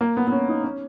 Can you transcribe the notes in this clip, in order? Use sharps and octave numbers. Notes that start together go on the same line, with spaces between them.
A#3
B3
B3
C#4
D#4
C#4